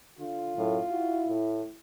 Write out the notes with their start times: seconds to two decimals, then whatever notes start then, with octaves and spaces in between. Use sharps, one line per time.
0.19 D3 F4
0.57 F#2 A2
0.90 E4 F#4
1.26 A2